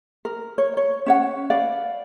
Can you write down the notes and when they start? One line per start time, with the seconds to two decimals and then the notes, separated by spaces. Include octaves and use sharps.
0.25 A#4
0.58 C#5
0.77 C#5
1.06 C#4 C#5 F#5
1.50 B4 D5 F5